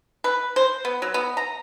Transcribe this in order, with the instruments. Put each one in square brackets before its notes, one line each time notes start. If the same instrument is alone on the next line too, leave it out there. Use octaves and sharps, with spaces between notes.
[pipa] B4
C5
B3
F#3
B3
A#5